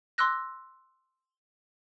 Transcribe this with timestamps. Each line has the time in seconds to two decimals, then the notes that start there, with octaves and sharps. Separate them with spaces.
0.18 C6 D6 E6 F#6 A#6